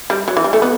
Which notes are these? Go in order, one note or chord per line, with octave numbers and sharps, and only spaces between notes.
G3
F#3
E3
G3
A3
B3